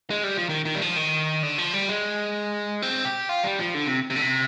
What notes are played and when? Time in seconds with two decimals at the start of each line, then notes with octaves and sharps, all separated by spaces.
0.10 G#3
0.24 G3
0.37 F3
0.49 D#3
0.65 D#3
0.75 G3
0.82 F3
0.97 D#3
1.43 D3
1.58 F3
1.74 G3
1.89 G#3
2.82 C4
3.05 G4
3.29 F4
3.44 G3
3.60 F3
3.75 D3
3.87 C3
4.10 C3
4.16 D3
4.22 C3